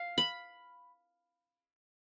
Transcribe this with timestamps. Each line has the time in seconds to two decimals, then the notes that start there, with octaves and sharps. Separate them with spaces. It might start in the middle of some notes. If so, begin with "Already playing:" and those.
Already playing: F5
0.18 B5